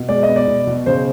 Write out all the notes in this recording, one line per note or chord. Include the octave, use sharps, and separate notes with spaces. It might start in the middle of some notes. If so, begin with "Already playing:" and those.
Already playing: B2
G#3 D5
D#5
B3
D5
B2
B2
C#3 C5